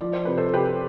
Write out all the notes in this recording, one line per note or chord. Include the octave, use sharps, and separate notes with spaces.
F3 D5
C5
C3 B4
A4 C5
C3 G4 B4